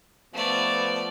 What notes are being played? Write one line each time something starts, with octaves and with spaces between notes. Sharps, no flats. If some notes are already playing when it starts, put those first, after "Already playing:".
F3 A3 B3 B4 D5